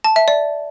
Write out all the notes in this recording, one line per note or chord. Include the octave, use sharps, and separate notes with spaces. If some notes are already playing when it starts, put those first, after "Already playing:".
A5
E5
D5